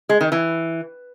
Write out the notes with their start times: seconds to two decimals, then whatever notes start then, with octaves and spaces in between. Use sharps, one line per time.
0.09 G#3
0.21 D#3
0.32 E3